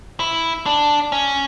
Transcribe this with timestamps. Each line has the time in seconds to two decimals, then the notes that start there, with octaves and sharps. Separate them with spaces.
0.20 E4
0.66 D4
1.12 C#4